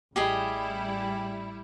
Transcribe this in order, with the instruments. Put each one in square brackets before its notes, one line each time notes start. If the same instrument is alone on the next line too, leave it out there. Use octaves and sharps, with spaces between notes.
[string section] A1 G3 E4 [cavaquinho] G4 G#4 D#5